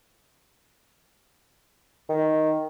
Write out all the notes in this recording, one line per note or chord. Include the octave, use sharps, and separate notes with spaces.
D#3